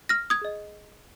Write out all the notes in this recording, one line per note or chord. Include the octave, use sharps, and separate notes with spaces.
F6 A#6
D#6 G#6
G#4 D#5